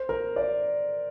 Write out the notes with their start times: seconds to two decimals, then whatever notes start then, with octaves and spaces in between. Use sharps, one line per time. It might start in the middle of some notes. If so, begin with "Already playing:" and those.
Already playing: C5
0.09 A#4
0.36 D5